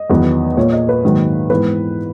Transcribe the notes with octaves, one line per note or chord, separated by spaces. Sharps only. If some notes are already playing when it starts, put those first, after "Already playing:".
Already playing: D#5
E2 D#3 F#3 B3
A#2 A#3 C#5
D#5
B4
G#2 D#3 F#3 A#3
G#2 E3 B3 B4